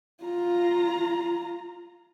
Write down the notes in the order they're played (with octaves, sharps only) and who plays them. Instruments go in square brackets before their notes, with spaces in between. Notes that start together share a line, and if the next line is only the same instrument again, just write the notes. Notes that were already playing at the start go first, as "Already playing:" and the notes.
[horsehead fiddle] F4 A#5